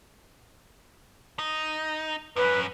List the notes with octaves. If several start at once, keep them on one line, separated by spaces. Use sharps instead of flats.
D#4
F#2 C#4 B4